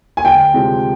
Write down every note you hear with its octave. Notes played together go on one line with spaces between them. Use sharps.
G#5
D2 G5
C3 F3 G#3